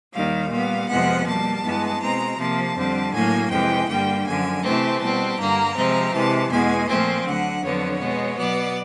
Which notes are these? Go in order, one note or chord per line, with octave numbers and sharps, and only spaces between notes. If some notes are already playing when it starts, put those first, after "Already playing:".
D#2 D#3 G3 F5
A#2 G3 B3 F5
F2 C3 F3 G#3 B3 F#5
B2 G3 A#3 A5
G2 E3 G#3 B3
B2 G#3 C4 A#5
C3 F3 A#3 A5
F2 D3 G3 C4
A2 F#3 A#3 G#5
F2 C3 E3 G#3 G5
G2 D3 G3 A#3 G5
F#2 D3 F3 G#5
C3 E3 A3 C4 A5
B2 G3 C4
G2 D3 G3 A#3 A#5
C3 F3 G#3 C4
C3 E3 G#3 A5
E2 B2 G#3 G#5
A#2 F3 A3 C4 G#5
D2 D3 F#3 F#5
F2 D3 F#3 B3 C#5
B2 G#3 B3
B2 F#3 B3 D5